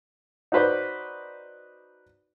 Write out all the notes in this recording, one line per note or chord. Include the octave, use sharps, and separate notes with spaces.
D#4 F#4 B4 C5 D5